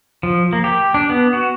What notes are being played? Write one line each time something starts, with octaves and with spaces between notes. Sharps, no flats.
F3
A#3
G4
D4
B3
F#4